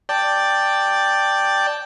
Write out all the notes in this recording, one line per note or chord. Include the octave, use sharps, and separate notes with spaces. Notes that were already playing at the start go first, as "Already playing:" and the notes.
D5 G5 A5